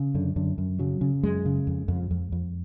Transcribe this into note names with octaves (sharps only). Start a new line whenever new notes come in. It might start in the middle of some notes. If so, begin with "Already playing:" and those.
Already playing: C#3
F#2 D3
F#2 D3
F#2
C#3 F#3
C#3
F#2 G#3
C#3
F2
F2
F2
F2